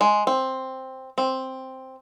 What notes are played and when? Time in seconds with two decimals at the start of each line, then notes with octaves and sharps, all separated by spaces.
0.01 G#3
0.27 C4
1.18 C4